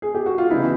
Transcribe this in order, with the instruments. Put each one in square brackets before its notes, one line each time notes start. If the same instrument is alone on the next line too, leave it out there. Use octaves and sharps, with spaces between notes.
[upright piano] G#4
G4
F#4
F4
[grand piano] C#3 E3 G3 B3 D#4 [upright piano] E4